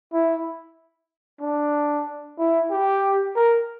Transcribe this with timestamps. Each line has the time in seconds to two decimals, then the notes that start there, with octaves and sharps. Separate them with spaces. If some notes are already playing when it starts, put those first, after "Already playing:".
0.13 E4
1.41 D4
2.39 E4
2.70 G4
3.36 A#4